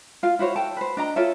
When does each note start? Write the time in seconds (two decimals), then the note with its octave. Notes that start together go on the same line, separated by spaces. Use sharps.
0.23 F4 F5
0.39 E4 F#4 C5 C#5
0.56 A4 G5 A5
0.77 B4 C5
0.97 D4 D#5 A#5
1.16 F4 A4 C#5 E5